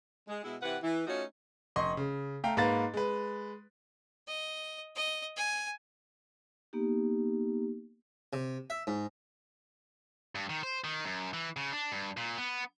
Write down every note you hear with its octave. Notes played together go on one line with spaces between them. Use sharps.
G#3
B2 G#3 E4
C3 E3 B4 F#5
E3
A3 C#4 D#4 F4 F#4
F1 D#5 C6 C#6
C#3
A3 F5 G5 A#5
G#2 A#3 B4 A#5 A6
G#3 B4
D#5
D#5
G#5
A#3 B3 D#4 G4
C3
E5
G#2
G2
D#3
C5
D#3
F#2
E3
C#3
D4
G2
A#2
B3